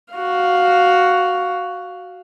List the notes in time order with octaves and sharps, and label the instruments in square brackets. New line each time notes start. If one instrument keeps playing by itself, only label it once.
[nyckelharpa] F#4 F5